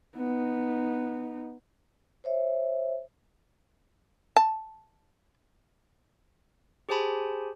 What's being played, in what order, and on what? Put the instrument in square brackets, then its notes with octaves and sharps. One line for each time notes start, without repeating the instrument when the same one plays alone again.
[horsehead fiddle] B3 D#4
[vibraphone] C5 C#5 E5
[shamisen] A5
[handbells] G4 G#4 C5 G#5 A5 B5